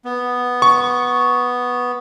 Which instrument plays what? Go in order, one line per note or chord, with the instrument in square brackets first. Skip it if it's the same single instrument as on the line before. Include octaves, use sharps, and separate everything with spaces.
[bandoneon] B3
[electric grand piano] C#6